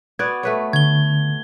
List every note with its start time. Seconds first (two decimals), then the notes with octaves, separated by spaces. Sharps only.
0.19 B3 F#4 D5 G#6
0.43 A3 B4 C#5
0.73 D3 G#6 G7